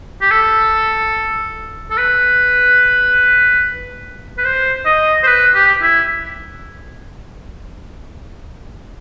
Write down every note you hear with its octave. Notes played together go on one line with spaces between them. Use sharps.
G4
A4
A4
B4
B4
C5
D#5
C5
B4
G4
E4